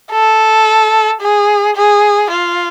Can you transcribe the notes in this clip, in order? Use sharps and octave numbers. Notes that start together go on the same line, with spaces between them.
A4
G#4
G#4
F4